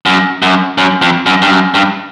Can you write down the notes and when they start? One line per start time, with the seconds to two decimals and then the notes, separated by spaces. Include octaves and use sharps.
0.06 F#2
0.42 F#2
0.78 F#2
1.02 F2
1.26 F#2
1.42 G2
1.51 F#2
1.74 G2